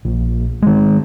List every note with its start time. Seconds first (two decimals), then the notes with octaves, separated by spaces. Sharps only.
0.05 A#1
0.62 D#3 G#3